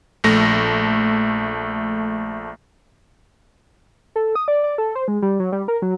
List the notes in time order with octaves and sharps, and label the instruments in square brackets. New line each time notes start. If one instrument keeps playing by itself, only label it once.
[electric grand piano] A#1 A3 A#6
[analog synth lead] A4
D#6
D5
D5
A4
C5
G#3
G3
F#3
G3
A#4
F#3